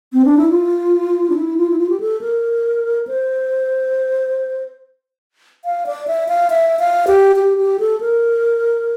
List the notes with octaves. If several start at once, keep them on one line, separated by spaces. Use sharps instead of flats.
C4
D4
E4
F4
D4
E4
F4
E4
F4
G4
A4
A#4
C5
F5
D5
E5
F5
E5
F5
G4
G4
G4
A4
A#4